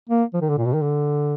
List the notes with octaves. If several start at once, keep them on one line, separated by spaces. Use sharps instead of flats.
A#3
F3
D#3
D3
A#2
B2
D#3
D3